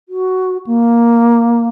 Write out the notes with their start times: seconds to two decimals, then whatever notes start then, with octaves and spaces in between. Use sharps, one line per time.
0.09 F#4
0.67 A#3